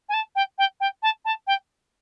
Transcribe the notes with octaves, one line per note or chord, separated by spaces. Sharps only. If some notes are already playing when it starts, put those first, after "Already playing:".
G#5
A5
G5
G5
G5
A5
A5
G5